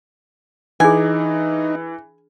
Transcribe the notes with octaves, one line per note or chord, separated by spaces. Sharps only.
E3 D4 D#4 G#4 G#5